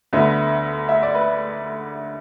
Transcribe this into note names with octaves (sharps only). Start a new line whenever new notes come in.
D2 D3 B3 E5
E5
D5
B4